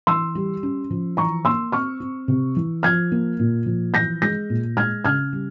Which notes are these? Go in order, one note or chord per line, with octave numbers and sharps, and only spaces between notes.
E3 C6 E6
G3
C#4
F3
E3 A#5 C#6
A#3 C6 E6
C4 C#6 F6
C4
C3
E3
F3 F6 G#6
A#3
A#2
F3
E3 G6 A#6
G#3 G6 A#6
A#2
G#3 F6 G#6
C#3 F6 G#6
G3